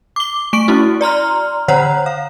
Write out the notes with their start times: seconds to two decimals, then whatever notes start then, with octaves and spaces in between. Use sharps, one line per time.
0.16 D6 G7
0.53 A3 C#6 D7
0.68 C#4 E4 F#4
1.01 D5 A#5 C6 F6
1.68 D3 C5 C#5 F#5 A#5
2.06 F5